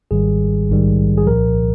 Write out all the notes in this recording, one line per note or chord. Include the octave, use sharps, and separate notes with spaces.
G#1 G#2 D#3 G3 G#4
A#1 G#2 D#3 G3
G#4
C2 A#2 F3 A#4